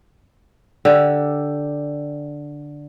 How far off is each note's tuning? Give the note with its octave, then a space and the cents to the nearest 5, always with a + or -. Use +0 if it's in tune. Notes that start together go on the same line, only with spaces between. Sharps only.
D3 +0 G4 +0